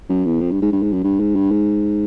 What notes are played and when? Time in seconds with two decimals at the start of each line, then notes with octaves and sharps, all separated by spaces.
0.09 F#2
0.25 E2
0.41 F2
0.51 G2
0.62 G#2
0.72 G2
0.83 G#2
0.93 F#2
1.03 G2
1.20 G#2
1.35 G2
1.51 G#2